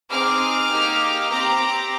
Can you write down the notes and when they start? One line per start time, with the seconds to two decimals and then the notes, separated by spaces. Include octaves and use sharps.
0.10 C4 D#4 G#4 D6 F6
0.71 A#3 D#4 G4
1.30 C4 G4 A#5 D6